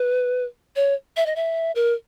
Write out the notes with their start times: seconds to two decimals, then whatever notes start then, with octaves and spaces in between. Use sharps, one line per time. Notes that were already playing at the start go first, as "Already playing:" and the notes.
Already playing: B4
0.76 C#5
1.17 E5
1.26 D#5
1.36 E5
1.75 A#4